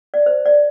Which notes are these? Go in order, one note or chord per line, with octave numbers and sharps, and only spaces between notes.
D5
C5
D5